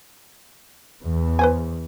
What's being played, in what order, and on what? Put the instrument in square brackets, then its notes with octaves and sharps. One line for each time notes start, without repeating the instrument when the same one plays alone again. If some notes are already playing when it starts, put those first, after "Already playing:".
[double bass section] E2
[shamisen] B4 C5 G#5